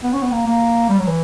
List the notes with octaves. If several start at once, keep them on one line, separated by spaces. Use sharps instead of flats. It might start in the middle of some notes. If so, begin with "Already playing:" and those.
B3
C#4
B3
A#3
A#3
G3
F#3
E3